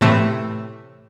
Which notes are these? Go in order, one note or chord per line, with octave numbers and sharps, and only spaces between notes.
A2 C3 E3 A3